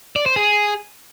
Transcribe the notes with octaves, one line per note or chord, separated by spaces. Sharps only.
D5
C5
G#4